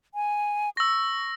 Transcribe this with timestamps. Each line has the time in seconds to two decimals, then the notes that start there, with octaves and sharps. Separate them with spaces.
0.14 G#5
0.77 C#6 E6 A#6